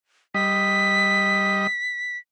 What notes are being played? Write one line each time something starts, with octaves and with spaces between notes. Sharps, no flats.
G3 D#5 B6